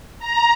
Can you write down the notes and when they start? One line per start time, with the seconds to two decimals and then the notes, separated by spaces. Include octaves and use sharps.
0.19 A#5